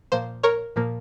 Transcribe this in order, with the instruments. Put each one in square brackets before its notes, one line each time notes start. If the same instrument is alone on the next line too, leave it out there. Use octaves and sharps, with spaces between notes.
[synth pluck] A#2 F3 A#3 C5
A#4 C#5
A#2 F3 A#3